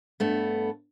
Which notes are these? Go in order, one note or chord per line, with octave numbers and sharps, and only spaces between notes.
G2 A3 B3